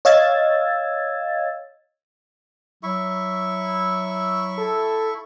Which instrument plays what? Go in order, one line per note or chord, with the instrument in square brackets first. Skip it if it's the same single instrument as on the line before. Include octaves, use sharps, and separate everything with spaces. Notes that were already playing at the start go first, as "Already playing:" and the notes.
[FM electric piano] C#5 D#5 F5 E6 G#6 A6
[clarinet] F#3 [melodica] E4 E5 C#6
[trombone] A4